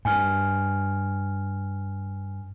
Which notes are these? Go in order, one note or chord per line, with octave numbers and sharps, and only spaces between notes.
G2 G#5 F6